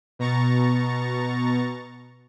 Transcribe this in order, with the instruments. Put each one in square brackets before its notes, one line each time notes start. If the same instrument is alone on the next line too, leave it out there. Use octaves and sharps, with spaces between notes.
[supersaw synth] B2 A#5 C#6 A6